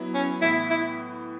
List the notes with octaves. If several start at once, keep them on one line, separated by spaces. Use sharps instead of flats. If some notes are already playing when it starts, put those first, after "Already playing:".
Already playing: F#3 B3 E4
C#4
A2 E3 B3 E4
E4